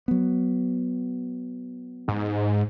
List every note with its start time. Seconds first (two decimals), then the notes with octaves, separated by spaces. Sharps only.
0.08 F#3 B3
2.08 G#2